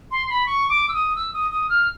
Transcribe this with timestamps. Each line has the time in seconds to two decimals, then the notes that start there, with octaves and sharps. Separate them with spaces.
0.11 C6
0.30 B5
0.46 C#6
0.69 D6
0.89 E6
0.94 D#6
1.16 E6
1.34 D#6
1.51 D#6
1.69 F6